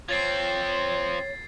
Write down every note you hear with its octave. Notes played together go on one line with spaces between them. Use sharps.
F3 C4 C#5 G#6 A6 C7